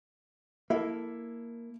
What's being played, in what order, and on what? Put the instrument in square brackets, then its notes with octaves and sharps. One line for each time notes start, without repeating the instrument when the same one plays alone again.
[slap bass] A#3 [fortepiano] E4 A4